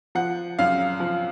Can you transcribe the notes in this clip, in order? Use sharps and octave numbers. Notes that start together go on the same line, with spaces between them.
F3 F#5
F#2 F5
F3